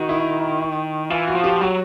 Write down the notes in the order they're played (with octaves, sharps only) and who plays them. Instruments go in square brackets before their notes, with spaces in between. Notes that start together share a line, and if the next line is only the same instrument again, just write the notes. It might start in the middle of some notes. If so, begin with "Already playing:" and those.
Already playing: [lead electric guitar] D#3 [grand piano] F#4
[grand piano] E4
[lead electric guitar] E3 [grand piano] F4
[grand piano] F#4
[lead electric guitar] F3
[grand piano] G4
[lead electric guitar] F#3 [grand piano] F#4